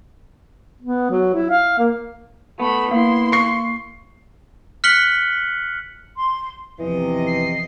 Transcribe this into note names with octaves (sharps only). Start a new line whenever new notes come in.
B3
F#3
E4
F5
A#3
A3 B3 B5
A#3 E4 C6
C#6 C7
F6 F#6 B6 C#7 F#7 G7
C6
E2 C3 E3 F3 D#5
C7